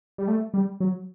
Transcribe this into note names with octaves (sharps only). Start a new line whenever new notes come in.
G3
A3
G3
F#3